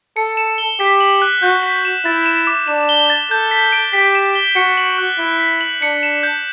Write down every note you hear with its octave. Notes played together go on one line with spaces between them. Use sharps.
A4 C#7
E7
G7
G4 B6
F#7
F#6
F#4 G6
B6
E7
E4 A6
E7
D6
D4 E7
G7
A6
A4 G6
B6
D7
G4 B6
E7
G7
F#4 C#7
F#7
F#6
E4 F#6
B6
F#7
D4 C#7
E7
G6